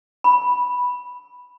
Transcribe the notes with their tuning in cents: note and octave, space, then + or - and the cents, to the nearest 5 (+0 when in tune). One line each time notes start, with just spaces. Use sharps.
B5 -5